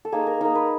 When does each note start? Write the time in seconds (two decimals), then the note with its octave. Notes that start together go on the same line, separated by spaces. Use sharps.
0.05 A4
0.12 A#3 D#4 G#4
0.27 A#4
0.41 A#3 D#4 A#4
0.55 B4